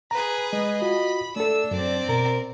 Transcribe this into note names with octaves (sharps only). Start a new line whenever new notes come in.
G#4 B4 A#5
G#3 D#5
F4 F#4 B5
A3 D4 A4 E6
F#2 C4 D5
B2 A#4